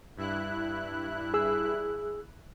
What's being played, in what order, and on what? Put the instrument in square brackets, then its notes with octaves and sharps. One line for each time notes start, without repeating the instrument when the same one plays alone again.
[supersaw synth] G2 E4 F#6
[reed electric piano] G#4 E6